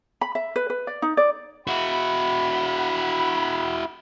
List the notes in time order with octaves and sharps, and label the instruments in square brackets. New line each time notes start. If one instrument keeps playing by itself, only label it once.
[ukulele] B5
E5
B4
B4
D5
D#4
D5
[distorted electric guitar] E4 F#4 [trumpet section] F#5 B5